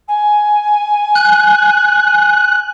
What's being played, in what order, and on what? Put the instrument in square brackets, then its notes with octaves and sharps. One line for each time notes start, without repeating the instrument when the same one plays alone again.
[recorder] G#5
[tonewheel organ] F#6